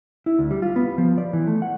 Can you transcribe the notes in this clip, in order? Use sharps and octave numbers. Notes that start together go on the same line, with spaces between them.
E4
D2
G3
F4
B3
F3
D5
E3
A3
F#5